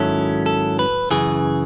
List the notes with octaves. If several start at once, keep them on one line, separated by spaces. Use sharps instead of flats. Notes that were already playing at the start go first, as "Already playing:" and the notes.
Already playing: G#2 D#3 F#3 C#4 E4 A4
A4
B4
F#2 C#3 E3 G#4